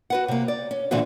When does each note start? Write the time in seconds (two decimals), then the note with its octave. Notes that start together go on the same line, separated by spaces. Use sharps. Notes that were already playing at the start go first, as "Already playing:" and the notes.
0.10 F#4 B4 F#5
0.28 C3 A#3
0.48 D5
0.71 C#4
0.91 A#2 D3 E3 C4 F#4